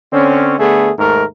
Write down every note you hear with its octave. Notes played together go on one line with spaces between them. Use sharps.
D3 C4 C#4
D3 A3 B3 G#4
D#2 G#2 A3 A#4